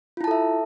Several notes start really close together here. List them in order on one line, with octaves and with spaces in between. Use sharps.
F4 E4 A5 A4 E5